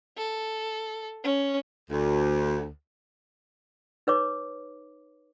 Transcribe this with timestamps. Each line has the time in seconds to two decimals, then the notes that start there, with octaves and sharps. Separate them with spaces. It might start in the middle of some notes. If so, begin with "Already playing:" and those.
0.17 A4
1.23 C#4
1.90 D2
4.07 D#4 B4 C#5 D6